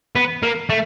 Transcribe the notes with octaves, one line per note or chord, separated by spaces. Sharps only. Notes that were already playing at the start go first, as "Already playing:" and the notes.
B3
A#3
A3